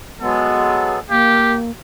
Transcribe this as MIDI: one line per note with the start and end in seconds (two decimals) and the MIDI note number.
0.21 0.99 54
0.21 0.99 56
0.21 0.99 59
0.21 1.00 69
1.10 1.71 58
1.10 1.57 67
1.10 1.55 77